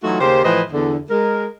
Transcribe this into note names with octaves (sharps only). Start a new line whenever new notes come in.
E3 F#3 A3 D#4 F4 F#4
D#2 C#3 G4 A#4 C5
A2 E3 F3 B4 C5 D#5
E2 D3
G#3 A#4